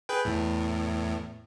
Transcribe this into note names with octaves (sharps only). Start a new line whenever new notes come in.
G#4 B4 G5
E2 A2